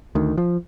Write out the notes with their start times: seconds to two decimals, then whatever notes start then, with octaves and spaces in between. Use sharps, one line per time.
0.15 D2 D#3
0.38 F3